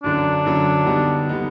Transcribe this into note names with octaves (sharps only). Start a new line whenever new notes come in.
F#2 D3 F#3 D4
F#2 D3 F#3
D3 G3 B3 D#4 G4
D3 G3 B3 D#4 G4